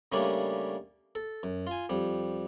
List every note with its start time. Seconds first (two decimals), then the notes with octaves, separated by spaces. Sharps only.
0.12 C#3 G3 A3 A#3 C#4 D4
1.15 A4
1.43 F#2
1.67 F4 G#5
1.89 F2 G3